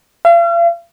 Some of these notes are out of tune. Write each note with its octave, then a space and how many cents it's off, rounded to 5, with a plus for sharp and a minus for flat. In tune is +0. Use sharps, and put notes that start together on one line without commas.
F5 -40